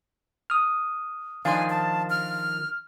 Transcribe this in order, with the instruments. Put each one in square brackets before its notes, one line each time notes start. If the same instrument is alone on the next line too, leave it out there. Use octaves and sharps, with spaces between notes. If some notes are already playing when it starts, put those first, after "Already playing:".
[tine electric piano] D#6 F6
[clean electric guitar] D#3 F3 D4 [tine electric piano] F5 C6 [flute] G#5
[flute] A5
F6